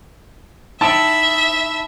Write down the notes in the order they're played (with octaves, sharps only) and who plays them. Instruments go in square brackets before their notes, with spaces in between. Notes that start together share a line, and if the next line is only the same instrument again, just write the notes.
[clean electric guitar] D#4 E4 G5 [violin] E5 [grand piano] A5